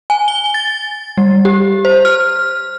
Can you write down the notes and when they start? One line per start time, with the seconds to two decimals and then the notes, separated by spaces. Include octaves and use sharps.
0.10 G#5
0.28 G7
0.54 A6
1.18 G3
1.45 G4
1.85 C5
2.05 F6